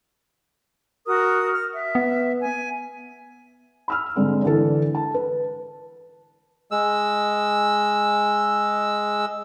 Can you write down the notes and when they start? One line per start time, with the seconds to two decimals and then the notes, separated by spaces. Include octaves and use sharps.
1.06 F#4 A#4 D#6
1.53 F6
1.73 E5
1.95 B3
2.41 G#5
3.88 B5 E6 F6
4.16 G#2 D3 G#3 C4
4.42 D3 E3 A4
4.95 A5
5.14 B4
6.71 G#3 E6